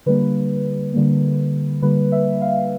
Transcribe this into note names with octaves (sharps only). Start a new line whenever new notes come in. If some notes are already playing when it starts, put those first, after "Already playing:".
D3 G3 A#3 B4
D3 G3 A#3
D3 G3 A#3 B4
E5
F5